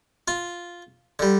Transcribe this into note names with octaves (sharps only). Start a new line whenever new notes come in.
F4
D3 G3